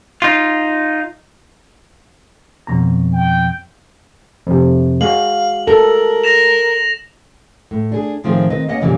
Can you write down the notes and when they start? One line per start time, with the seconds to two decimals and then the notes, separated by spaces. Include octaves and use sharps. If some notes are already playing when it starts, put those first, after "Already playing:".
0.22 D#4 F4
2.67 F2 B2 A#5
3.13 G5
4.47 F2 C3
5.01 G#3 F#4 F5 F#7
5.68 A4 A#4
6.24 A#6 E7 F7
7.71 A2
7.92 D4 G#4
8.24 A2 D#3 F3 C4 F4 G#4
8.50 D#3 C4 B4 D#5
8.68 A#3 B3 C#4 D#5 F#5
8.81 F2 A#2 C#3 E3 F#3 G3